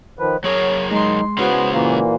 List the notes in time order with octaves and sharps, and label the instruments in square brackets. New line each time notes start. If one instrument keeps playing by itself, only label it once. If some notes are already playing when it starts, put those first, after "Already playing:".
[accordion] D#3 F3 B4
[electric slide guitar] F#3 G#4 A#4 [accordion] C#5
[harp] G#3 C6 [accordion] D#4
[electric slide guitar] C#3 G#3 C#4 [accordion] B3 [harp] E4 F#4 C5
[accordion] A#2 E3 A#3